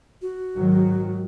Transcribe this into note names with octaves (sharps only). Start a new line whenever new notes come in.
F#4
G#2 D#3 F#3